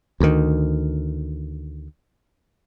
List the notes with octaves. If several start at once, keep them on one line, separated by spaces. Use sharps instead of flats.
D2 D#3